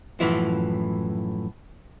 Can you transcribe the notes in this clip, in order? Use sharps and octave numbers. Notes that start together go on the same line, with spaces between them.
F#2 A2 E3 F3 E4